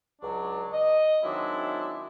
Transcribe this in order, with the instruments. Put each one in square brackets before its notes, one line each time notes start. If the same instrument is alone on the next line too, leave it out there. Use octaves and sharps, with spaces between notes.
[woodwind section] C#2 F#3 D4
D#5
D#3 F#3 G#3 C4 D4 E4